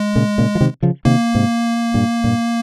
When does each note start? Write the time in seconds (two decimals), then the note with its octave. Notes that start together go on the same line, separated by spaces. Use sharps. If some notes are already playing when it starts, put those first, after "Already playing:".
Already playing: G#3
0.15 A#2 C#3
0.38 A#2 C#3
0.55 F3
0.60 C3 D#3
0.82 C#3 F3
1.05 C3 D#3 A#3
1.35 G#2 C3
1.94 G2 A#2
2.24 G2 A#2